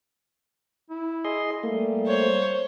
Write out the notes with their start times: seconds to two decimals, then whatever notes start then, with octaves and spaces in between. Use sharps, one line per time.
0.90 E4
1.24 G#4 D#5 C6
1.63 G3 A3 A#3
2.06 C5 C#5